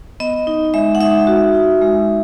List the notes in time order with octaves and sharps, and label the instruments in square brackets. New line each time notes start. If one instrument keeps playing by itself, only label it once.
[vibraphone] B3 D#5
D#4
G#3 E5
F#5
D#4 E5
F#4
D#4
G#3